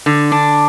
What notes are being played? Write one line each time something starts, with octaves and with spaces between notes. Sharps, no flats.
D3
D4